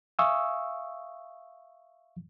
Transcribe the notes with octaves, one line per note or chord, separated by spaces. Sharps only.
E5 F5 G#5 C#6 D#6 E6